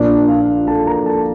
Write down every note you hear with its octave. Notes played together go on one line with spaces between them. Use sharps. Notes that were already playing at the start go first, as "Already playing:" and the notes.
Already playing: A#1 A#2 F3 A#3 D4 D5
F4 F5
A4 A5
A#4 A#5
A4 A5